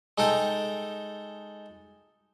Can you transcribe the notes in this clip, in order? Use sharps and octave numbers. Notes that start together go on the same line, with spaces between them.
G#3 D#4 A4 G5